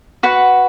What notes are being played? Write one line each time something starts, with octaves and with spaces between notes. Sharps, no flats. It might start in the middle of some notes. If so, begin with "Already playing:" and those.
F#4 B4 F#5